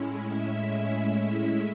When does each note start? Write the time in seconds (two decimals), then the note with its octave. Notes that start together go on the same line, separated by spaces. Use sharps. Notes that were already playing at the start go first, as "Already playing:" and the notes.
Already playing: A2 G#3 C#4 E4
0.25 E5